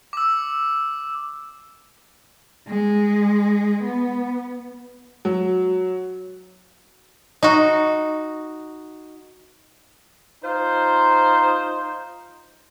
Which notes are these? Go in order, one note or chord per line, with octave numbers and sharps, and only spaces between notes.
D6 E6
G#3
B3
F#3
D#4 F#4
D#4 F4 C5